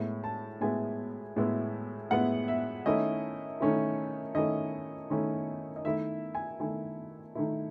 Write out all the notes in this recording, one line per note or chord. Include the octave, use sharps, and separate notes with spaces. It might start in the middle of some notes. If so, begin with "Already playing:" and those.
Already playing: A2 G#3 B3 E4
A5
A2 G#3 B3 E4 G#5
A2 G#3 B3 E4
A2 G#3 B3 E4 F#5
E5
D#3 A3 C#4 E4 D#5
D#3 A3 C#4 E4
D#3 A3 C#4 E4 D#5
D#3 A3 C#4 E4
D#5
D#3 A3 E4 E5
G#5
D#3 A3 E4 G#5
D#3 A3 E4